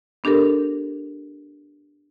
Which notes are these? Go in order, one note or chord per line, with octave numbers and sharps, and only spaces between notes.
B3 D4 G4 A4 A#4